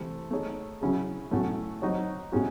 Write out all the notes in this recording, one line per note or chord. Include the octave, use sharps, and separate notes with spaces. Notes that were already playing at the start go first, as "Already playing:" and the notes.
Already playing: C3 E3 A3
A3 D#4 G#4 C#5
C#3 F#3 C#4 E4 G#4
A2 F#3 A3 C#4
F#3 C4 D#4 F#4 C#5
A2 G#3 C#4 F#4